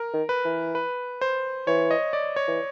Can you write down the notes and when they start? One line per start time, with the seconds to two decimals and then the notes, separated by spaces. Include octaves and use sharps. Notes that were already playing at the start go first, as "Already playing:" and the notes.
Already playing: A#4
0.13 D#3
0.29 B4
0.45 E3
0.75 B4
1.21 C5
1.67 E3 C#5
1.91 D#5
2.13 D5
2.36 C#5
2.47 E3